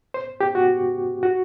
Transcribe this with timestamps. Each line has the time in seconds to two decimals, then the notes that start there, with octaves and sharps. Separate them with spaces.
0.14 C5
0.41 G4
0.55 F#4
1.23 F#4